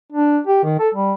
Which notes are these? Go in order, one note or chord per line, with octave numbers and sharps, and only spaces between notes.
D4
G4
D#3
A4
G3